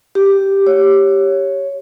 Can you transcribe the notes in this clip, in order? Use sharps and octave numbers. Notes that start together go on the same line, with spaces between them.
G4
C#5